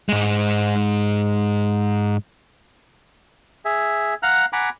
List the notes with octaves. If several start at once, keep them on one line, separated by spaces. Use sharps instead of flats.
G#2 G#3
G#4 E5
F5 F#5 A#5 F6 F#6
F#5 G#5 A#5 B5 D6